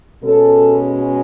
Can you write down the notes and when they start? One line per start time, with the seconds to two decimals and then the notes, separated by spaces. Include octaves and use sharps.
0.23 B2 G#3 C#4 A4